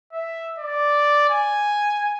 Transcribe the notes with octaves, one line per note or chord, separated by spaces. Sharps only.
E5
D5
G#5